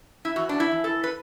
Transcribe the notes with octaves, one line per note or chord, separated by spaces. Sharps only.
E4
E3 F#4
D4
E4
E3
A4
B4